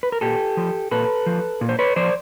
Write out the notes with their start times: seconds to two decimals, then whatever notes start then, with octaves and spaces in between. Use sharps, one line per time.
0.03 B4
0.12 A#4
0.21 A#2 G4 A4
0.57 F3
0.91 A#2 A4 B4
1.26 F3
1.61 A#2
1.69 C5
1.79 B4 C#5
1.96 F3 C5 D5